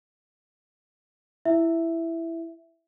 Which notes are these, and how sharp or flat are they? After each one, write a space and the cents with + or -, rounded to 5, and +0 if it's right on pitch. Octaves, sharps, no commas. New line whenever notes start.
E4 +10 E5 +0